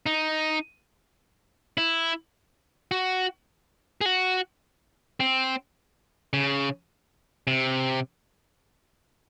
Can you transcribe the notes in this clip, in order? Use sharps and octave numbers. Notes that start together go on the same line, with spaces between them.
D#4
E4
F#4
G#4
F#4
C4
C#3
C3